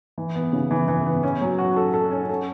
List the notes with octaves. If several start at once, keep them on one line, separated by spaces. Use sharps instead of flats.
E3
B3
C#3
E3
E3
B3
C#4
F#3
F#4
A4
A4
C#4
A4